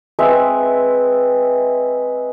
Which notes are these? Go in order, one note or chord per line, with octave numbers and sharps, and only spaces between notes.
G#3 C4 B4 E5